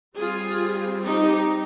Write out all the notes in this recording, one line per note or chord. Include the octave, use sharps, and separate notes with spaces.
G3 C4 F4 G#4
D#4 G4